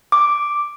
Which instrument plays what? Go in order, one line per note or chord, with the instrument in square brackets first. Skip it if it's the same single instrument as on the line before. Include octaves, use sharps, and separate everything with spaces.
[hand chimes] D6